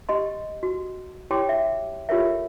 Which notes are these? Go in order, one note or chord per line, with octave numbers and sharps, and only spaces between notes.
G4 D#5 C6
F#4
E4 G4 C#5 G5 C6 D6
E5
F4 G4 A4 A#4 C#5 E5